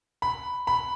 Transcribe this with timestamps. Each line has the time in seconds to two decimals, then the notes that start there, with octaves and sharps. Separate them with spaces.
0.22 B5
0.67 B5